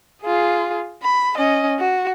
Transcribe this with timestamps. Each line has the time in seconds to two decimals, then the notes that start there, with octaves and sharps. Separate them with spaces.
0.22 F4 G#4
1.03 B5
1.36 C#4 D#5
1.79 F#4